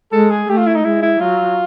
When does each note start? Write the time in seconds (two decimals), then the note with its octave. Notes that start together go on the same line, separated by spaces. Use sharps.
0.12 G#3 A4
0.31 G#4
0.49 A3 G4
0.58 F4
0.67 E4
0.75 D#4
0.84 G#3 E4
1.03 E4
1.20 F#3 F4